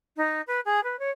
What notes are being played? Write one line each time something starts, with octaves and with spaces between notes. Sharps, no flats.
D#4
B4
G#4
B4
C#5